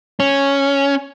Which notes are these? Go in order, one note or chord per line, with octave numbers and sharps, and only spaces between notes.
C#4